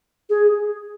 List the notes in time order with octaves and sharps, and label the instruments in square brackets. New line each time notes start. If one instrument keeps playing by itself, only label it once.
[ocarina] G#4